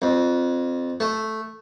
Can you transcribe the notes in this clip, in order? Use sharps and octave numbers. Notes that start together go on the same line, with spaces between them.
F2
A3